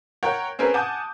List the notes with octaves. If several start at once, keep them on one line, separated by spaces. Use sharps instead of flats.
A#4 C#5 F#5 G5
C4 C#4 G#4 A#4 B4
F#5 G#5 A5 D6 D#6 G6